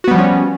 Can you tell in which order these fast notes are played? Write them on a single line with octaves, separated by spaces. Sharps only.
F#4 B3 G3 F3 C#4